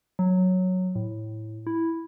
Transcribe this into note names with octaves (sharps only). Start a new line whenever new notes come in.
F#3
A2
E4